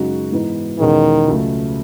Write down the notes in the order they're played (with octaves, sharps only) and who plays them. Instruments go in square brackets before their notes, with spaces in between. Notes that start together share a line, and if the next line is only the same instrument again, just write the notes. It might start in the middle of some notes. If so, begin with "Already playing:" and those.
Already playing: [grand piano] F#2 C#3 G#3 D#4 F#4
G#2 E3 B3 D#4
[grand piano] E2 B2 G#3 C#4 G#4 [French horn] D#3
[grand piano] C#2 C#3 F#3 A3